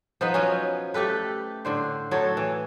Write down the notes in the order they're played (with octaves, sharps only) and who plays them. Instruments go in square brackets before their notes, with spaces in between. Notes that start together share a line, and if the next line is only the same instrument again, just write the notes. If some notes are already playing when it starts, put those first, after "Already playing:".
[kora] F3 B3 D#4 B4
F3 F#3 C#4
A3 G4 A4 B4
A2 D3 C5
A2 F#3 A4 C#5
E3